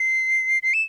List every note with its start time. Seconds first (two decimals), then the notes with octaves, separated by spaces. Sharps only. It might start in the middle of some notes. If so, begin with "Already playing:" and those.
Already playing: C7
0.63 C7
0.74 E7